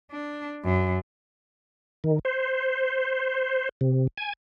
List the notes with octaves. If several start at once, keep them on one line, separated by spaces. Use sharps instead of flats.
D4
F#2
D#3
C5
C3
G#5